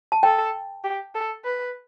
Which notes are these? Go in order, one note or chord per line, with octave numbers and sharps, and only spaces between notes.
A5
A4 G5
G4
A4
B4